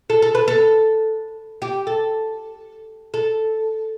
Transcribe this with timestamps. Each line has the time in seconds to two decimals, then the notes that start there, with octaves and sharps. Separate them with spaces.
0.10 A4
0.22 A4
0.35 B4
0.48 A4
1.62 G4
1.87 A4
3.14 A4